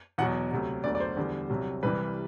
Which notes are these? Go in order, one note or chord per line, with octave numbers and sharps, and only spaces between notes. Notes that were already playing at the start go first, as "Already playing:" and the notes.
E2 B2 F#3 F#5
D2 C3 F#3
E1 D2 D3 F#3 D5
D5
C5
E2 D3 G3
C2 C3 F#3
C2 C3 E3 G3 B4